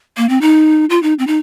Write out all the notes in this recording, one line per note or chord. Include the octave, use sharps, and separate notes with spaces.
A#3
C4
D#4
F4
D#4
C4
D#4